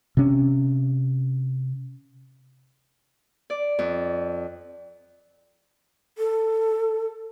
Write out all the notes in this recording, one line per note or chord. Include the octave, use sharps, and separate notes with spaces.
C3 C#4
D5
F2
A4